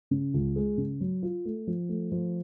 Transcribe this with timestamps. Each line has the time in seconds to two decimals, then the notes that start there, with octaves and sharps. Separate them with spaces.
0.11 C#3
0.34 C#2
0.56 G#3
0.77 C#3
1.01 F#3
1.23 F4
1.45 A3
1.67 F3
1.89 A3
2.12 F3